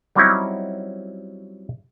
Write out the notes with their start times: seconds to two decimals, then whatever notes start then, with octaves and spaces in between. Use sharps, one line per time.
0.15 F#3 G3 C4 C#4 D#4 E4